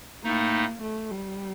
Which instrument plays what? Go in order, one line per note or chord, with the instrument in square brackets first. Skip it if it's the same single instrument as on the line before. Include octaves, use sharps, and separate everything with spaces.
[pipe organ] A2 A3 D#4 [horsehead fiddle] A#3
[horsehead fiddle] A3
G3